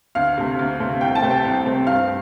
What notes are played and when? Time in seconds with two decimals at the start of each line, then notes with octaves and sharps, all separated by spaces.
0.15 D2 F5
0.38 C3 A3
0.59 D2
0.80 C3 A3 C4
1.01 C2 G5
1.15 A5
1.22 C3 A3 C4
1.30 G5
1.45 C2
1.65 C3 A3 C4
1.87 G2 F5